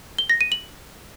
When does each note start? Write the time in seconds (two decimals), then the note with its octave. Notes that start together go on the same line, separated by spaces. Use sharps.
0.18 G7
0.30 A#6
0.41 D#7
0.52 F#7